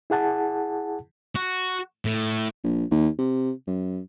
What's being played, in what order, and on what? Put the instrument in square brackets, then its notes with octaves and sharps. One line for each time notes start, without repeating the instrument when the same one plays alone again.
[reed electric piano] E4 G#4 F#5 A5
[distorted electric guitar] F#4
A2
[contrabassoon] A#1
D#2
C3
F#2